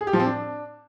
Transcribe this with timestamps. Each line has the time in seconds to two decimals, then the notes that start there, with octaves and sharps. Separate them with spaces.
0.01 G#4
0.07 G4
0.13 F3
0.20 C4
0.26 D4